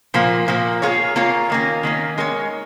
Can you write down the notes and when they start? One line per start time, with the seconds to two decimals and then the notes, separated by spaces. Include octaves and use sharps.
0.14 A#2 F3 A#3
0.48 A#2 F3 A#3
0.82 A#3 F4 G#4 C#5
1.16 A#3 F4 G#4 C#5
1.50 D#3 A#3 C#4
1.83 D#3 A#3 C#4
2.18 G#3 D#4 A#4 C#5